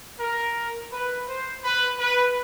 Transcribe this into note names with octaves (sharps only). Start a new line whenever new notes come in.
A#4
B4
C5
B4
B4